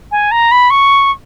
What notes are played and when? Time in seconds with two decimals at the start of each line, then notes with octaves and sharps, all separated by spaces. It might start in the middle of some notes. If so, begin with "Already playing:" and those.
0.12 G#5
0.31 A#5
0.52 B5
0.70 C#6